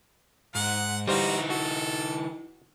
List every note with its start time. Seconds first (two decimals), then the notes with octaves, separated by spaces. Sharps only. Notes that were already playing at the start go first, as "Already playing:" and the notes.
0.55 G#2 F#5
1.08 E3 G3 D#4 F#4 C5 F5 A#5
1.50 F#4 A4